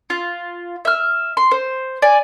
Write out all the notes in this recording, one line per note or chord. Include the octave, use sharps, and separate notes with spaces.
F4
E5 F6
C6
C5
D5 G#5